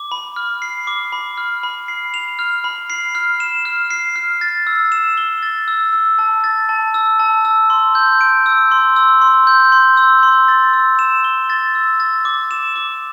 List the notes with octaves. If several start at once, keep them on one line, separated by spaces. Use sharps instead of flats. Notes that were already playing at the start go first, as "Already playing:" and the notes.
Already playing: D6
B5
F6
C7
D6
B5
F6
B5
C7
F7
F6
B5
C7
F6
E7
F6
C7
F6
A6
E6
E7
G7
A6
E6
E6
A5
A6
A5
E6
A5
E6
C6
G6
D7
E6
C6
E6
C6
G6
C6
E6
C6
A6
E6
E7
G7
A6
E6
A6
D6
E7
D6